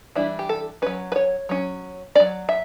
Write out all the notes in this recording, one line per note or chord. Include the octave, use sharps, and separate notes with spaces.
E3 G3 D4 E4
G4
A4
F#3 C#4 B4
B4
C#5
F#3 C#4
F#3 C#4 D5
E5